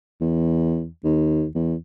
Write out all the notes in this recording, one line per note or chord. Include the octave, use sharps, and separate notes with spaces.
E2
D#2
E2